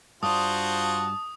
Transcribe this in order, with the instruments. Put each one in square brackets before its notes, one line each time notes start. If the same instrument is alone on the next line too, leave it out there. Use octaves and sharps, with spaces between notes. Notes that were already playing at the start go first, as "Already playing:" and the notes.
[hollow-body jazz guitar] G2 D5 [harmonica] F4 F#4 C5 [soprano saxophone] A5 [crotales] D#6